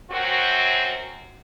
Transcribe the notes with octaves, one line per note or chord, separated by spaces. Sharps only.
F#2 C4 F#4